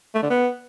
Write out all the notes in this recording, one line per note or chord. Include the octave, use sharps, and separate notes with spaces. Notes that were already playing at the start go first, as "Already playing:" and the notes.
A3
D3
B3